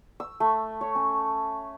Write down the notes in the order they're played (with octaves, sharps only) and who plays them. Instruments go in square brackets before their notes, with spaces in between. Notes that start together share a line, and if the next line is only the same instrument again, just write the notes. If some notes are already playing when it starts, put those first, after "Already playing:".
[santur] E6
A3
C#5
C#4